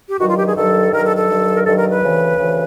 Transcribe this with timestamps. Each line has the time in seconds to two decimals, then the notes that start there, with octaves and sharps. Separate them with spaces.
0.10 G4
0.19 G2 D#3 F#3 F#4
0.28 F4
0.38 G4
0.47 G#4
0.56 G2 D#3 F#3 A4
0.92 G2 D#3 F#3 A#4
1.05 A4
1.16 A4
1.29 G2 D#3 F#3
1.54 A#4
1.66 G2 D#3 F#3 A4
1.77 A#4
1.90 B4
2.02 D2 C#3 E3
2.38 D2 C#3 E3